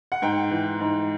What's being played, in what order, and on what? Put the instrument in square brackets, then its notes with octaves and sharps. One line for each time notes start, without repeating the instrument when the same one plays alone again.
[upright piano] F#5
G#2 G5
E3
G#2